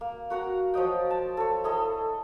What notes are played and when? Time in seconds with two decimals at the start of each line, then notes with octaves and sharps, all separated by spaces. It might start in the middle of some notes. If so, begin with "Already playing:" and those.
0.01 A#3
0.30 F#4 A#4 F#5 A#5
0.74 F3 F#3 D#5 G5
1.10 A5
1.37 A4 C#5
1.64 E4 G#4 A4 D#5